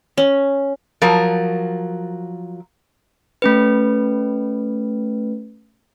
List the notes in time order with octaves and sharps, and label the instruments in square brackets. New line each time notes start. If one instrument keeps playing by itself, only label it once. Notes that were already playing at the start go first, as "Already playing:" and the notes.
[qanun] C#4
[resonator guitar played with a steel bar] F3 F#3 A#4
[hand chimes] A3 C#4 B4